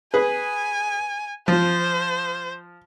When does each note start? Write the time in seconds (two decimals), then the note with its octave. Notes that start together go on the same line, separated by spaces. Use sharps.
0.14 G#4 B4 G#5
1.48 F3 C5